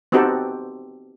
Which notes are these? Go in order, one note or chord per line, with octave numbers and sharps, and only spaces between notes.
B3 C4 D#4 F#4 G4 A4